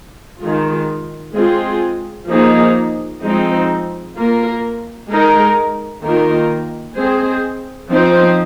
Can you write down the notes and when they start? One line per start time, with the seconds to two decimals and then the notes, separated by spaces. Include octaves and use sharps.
0.42 D#3 G#3 F4
1.34 G#3 C4 F4 G#4
2.28 F3 A#3 D#4 G#4
3.22 F3 G#3 C4 D#4
4.15 A#3 F4 A#4
5.10 G#3 D#4 A#4
6.03 D#3 A#3 F4 A#4
6.96 G#3 C4 G#4 C5
7.89 F3 C4 D#4 C5